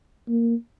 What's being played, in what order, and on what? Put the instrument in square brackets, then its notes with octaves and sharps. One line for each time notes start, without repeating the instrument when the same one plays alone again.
[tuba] A#3